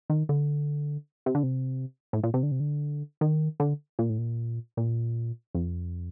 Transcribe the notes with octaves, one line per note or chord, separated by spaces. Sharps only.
D#3
D3
C3
D3
C3
A2
A#2
C3
D3
C3
D3
D#3
D3
A#2
A2
A#2
A#2
F2